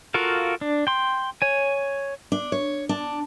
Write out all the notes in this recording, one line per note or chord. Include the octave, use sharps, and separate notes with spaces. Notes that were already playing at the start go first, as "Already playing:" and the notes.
F4 F#4 A4 A#4 F5
D4
G5 C6
C#5 G#5
D4
C#5
D4